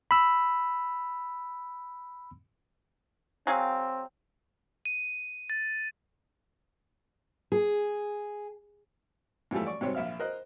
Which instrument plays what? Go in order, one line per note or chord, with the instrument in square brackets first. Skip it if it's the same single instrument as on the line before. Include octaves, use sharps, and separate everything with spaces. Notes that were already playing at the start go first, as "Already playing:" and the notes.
[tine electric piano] B5 E6
[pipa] F#3 G#4 F5 [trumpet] C4
[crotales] D#7
A6
[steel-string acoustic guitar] G#4
[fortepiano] G#2 E3 F3 G3 A3
D5 C#6
G#2 C3 F#3 G3 C4 C#5
A#1 E5 F5 F6
A#4 C5 D#5 F#6